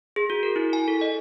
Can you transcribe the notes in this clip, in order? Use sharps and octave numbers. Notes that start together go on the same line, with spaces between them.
G#4
F#4
A#4
E4
G#5
A4
D#5